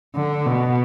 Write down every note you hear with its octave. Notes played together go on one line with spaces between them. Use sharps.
D3
B2